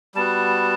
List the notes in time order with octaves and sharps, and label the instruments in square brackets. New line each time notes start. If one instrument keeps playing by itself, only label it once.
[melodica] G3 B3 F#4 A5